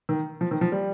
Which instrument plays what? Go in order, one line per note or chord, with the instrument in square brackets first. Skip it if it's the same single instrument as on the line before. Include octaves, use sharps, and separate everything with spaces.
[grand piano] D#3
F3
D#3
F3
G3